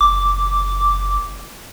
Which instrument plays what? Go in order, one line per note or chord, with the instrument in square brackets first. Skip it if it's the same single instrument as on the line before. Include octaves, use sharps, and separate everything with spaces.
[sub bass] F#1 [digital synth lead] D6